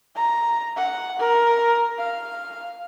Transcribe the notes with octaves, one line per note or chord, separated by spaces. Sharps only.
A#5
F#5
A#4
F5